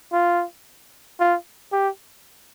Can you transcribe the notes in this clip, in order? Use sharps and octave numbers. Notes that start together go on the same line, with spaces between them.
F4
F4
G4